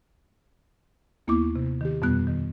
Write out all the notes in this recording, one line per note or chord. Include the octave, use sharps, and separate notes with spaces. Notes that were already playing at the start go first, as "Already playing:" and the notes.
D#2 A#3 B3 E4 C#6 D6
C3
D#3 G4
F2 B2 G3 B3 F#6
D#3